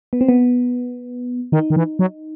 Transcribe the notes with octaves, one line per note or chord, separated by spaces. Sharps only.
B3
C4
B3
D#3 D#4
D#3
E3
F#3